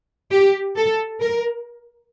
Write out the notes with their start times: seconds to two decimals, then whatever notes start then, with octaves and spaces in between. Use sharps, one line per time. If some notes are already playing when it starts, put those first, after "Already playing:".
0.31 G4
0.76 A4
1.20 A#4